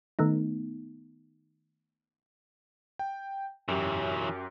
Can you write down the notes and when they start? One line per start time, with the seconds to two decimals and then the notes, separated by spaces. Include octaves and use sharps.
0.19 D#3 A3 B3 D#4
2.99 G5
3.68 F#2 E3 F#3 G4